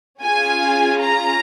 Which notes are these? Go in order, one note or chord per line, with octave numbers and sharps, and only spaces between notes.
C#4 F4 G#4 G#5
A#5